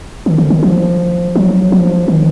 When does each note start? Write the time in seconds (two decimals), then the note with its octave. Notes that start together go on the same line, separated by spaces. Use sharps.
0.26 D#3
0.38 D3
0.50 D#3
0.63 F3
1.36 F#3
1.72 F3
2.08 D#3